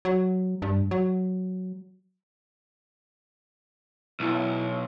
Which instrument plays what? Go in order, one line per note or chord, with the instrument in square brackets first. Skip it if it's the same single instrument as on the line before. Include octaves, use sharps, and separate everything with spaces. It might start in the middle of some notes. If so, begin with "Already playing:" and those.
[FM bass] F#3
G2
F#3
[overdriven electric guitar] B1 [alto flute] E4